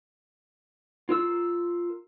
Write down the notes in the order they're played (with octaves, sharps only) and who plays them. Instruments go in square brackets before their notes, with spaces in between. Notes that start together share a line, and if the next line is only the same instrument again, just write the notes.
[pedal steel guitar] F4 A#4 E6